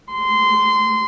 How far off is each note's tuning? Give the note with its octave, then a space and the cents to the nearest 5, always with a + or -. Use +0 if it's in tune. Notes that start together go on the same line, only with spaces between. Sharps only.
C6 -20